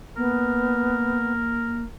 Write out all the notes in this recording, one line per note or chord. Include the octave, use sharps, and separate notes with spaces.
A#3 B3 A#4